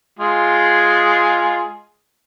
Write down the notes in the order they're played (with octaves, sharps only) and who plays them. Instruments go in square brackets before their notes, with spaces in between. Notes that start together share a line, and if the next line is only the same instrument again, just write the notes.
[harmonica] G#3 F4 G#4